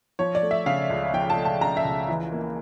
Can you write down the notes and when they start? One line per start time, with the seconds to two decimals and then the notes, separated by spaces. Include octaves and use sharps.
0.19 F3 C#5
0.35 D5
0.42 A3
0.51 E5
0.66 C#3 F5
0.90 C#2
1.13 F3 G5
1.30 A5
1.37 A3
1.45 A5
1.61 C#3 A#5
1.77 E5
1.85 C#2
2.08 E3
2.32 A#3